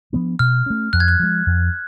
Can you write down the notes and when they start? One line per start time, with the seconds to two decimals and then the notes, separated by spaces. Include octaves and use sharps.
0.13 F3 B3 D4
0.39 B2 F6
0.66 A3 C#4
0.93 F2 F#6
1.00 G#6
1.08 F#6
1.20 F3 G#3
1.47 F2